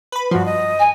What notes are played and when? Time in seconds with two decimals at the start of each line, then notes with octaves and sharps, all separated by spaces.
0.12 B4 B5
0.31 G2 F3 F#4
0.46 D#5
0.79 G#5